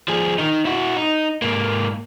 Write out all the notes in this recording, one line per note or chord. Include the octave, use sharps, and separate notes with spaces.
F3 G#4
D#3 D#4
E4 F#4
D#4
G#2 A#3